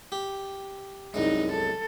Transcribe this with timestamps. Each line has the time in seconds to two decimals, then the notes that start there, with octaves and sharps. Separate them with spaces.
0.12 G4
1.14 C2 F#2 G#3 D#4
1.51 A4